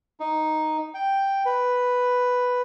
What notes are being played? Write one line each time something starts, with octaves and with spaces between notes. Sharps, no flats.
D#4
G5
B4